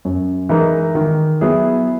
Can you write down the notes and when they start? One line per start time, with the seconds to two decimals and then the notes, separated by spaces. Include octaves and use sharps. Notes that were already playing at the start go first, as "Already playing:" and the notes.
0.05 F#2
0.49 E3 G#3 D#4 A#4
0.95 D#3
1.41 F#3 B3 E4 G#4